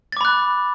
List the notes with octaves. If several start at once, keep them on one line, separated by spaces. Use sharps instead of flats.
B5 D6 F#6 A6